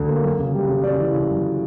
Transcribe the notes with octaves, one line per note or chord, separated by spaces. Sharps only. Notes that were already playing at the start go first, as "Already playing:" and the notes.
Already playing: D2 D3
A#3
F#2
C#3
G3
C#3
C#3 D5
E3
C#3
F#2